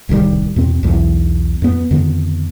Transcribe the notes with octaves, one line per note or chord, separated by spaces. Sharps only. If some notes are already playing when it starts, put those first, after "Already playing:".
D1 C2 D#3 G3
E2 B2 C4
B1 E2
F2 B3
F2 D3 D#3 B3